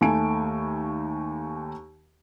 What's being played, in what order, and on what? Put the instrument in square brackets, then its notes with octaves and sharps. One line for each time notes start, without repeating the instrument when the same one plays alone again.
[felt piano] D#2 A3 G#5 D7